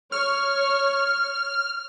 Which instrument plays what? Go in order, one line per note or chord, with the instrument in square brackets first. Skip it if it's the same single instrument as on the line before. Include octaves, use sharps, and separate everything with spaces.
[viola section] C#5 [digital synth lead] F6